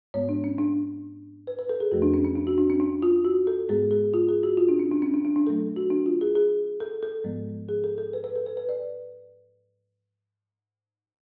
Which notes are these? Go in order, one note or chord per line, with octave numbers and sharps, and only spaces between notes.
G#2 G#3 B3 C#5
D4
C#4
D4
B4
B4
A4
G#4
F2 F3 A3 F#4
D4
C#4
C#4
D4
F#4
D4
C#4
D4
F4
F#4
A4
G#2 G#3 B3 G#4
G#4
F4
G#4
F#4
F4
D4
C#4
D4
C#4
D4
D4
D4
B2 F#3 A3 A4
F#4
D4
F4
G#4
G#4
A4
A4
G#2 F3 G#3 B3
G#4
A4
A4
B4
B4
A4
B4
B4
D5